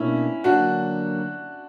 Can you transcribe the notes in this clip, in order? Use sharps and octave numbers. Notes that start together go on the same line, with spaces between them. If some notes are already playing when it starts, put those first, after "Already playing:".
Already playing: B2 A#3 C#4 D4 E4
D3 F#3 A#3 D4 F#4